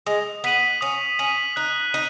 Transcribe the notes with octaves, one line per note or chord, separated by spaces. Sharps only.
G#3 D#6
B3 B6 D#7 F#7
C#4 D#6
C#4 B6 D#7 F#7
D#4 F#6
D#4 D#7